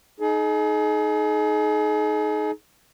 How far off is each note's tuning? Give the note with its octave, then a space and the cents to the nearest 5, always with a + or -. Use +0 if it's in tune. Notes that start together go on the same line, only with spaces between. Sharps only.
D#4 +0 G#4 +35